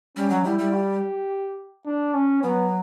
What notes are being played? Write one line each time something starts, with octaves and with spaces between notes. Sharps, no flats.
G3 C#4
F#3
G3 E4
G3
G4
D4
C#4
F#3 B3